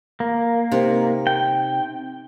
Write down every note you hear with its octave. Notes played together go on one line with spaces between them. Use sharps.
A#3
C3 D#4
G5